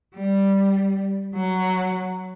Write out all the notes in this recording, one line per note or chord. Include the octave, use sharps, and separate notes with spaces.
G3
F#3